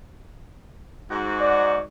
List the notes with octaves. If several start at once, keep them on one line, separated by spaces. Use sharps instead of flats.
G#2 F#4
D5